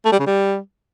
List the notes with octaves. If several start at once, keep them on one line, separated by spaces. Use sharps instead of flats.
A3
G3
C#3
G3